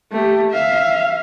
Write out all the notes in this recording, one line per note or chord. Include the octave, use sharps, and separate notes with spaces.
A3 G4
E5 F5